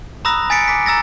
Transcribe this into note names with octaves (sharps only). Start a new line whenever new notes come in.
A#5 B5 D#6 E6 F#6 A#6
G#5 A6 B6 C#7 D7
D6 B6
A#5 E6 A6 A#6